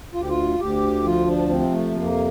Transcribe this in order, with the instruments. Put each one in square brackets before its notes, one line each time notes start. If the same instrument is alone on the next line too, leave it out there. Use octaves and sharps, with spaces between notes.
[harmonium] D2 F4
G4
F4
D2 G4
F3 F4
D4
C3 C4
A3
F2 A#3